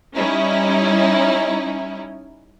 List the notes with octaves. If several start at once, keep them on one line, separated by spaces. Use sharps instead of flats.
G3 C#4 D#4 E4